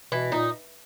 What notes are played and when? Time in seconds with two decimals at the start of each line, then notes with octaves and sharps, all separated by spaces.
0.11 B2 E3
0.32 A#2 D#4